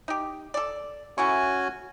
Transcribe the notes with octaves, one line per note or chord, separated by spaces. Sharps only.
D#4 G4
A4 D5
A3 C#4 E4 F#4 G#5 C#6